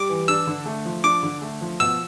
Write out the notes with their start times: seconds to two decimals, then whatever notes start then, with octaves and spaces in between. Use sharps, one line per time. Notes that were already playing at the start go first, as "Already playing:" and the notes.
Already playing: G3 D6
0.09 E3
0.28 D4 E6
0.47 D3
0.66 A3
0.85 F3
1.04 D4 D6
1.23 D3
1.42 A3
1.61 F3
1.80 B2 E6